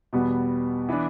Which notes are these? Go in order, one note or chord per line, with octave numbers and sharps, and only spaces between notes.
E2 B2 G3 B3
E3 B3 D4